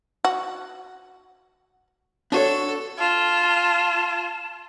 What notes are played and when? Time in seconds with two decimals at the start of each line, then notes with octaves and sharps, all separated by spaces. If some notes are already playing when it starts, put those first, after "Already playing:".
0.25 F#4
2.32 D4 F#4 A4 C#5
2.99 F4 A5